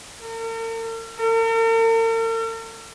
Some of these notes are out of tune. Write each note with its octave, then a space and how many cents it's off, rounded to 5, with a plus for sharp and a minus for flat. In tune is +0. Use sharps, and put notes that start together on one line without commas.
A#4 -45
A#4 -45